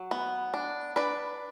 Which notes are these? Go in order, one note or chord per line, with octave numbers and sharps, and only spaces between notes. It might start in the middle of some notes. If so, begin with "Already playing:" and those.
Already playing: F#3
B3
D4
D4 B4 D5